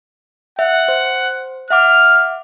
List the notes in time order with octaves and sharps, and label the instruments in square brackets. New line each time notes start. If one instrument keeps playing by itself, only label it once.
[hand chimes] E5 [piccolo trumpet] F#5
[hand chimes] C5
[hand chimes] E5 F#5 D6 [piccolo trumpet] F6